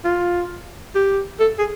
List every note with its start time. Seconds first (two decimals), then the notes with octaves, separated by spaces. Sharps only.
0.05 F4
0.95 G4
1.40 A4
1.59 G#4